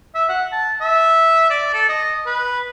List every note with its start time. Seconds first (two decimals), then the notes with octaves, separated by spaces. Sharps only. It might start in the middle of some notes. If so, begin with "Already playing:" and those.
0.15 E5
0.29 F#5
0.52 A5
0.81 E5
1.50 D5
1.74 A4
1.89 D#5
2.26 B4